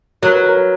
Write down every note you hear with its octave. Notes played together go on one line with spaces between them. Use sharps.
F#3 A#4
B4
A#4
A#4